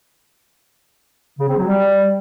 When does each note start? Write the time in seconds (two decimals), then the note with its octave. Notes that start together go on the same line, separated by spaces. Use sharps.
1.39 C#3
1.48 C4
1.57 F#3
1.66 G3